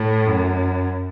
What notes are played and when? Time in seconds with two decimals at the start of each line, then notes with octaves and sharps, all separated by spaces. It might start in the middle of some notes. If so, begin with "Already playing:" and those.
Already playing: A2
0.26 F#2